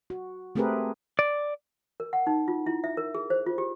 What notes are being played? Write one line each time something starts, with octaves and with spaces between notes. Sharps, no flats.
F#4
A3 C4 G4 G#4 A#4 B4
D5
A#4
F#5
D#4
F4
E4
E5
A#4
G#4
C5
F4
G4